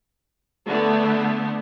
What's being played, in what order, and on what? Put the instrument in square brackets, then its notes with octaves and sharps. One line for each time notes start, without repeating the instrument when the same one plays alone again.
[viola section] D3 A3 B3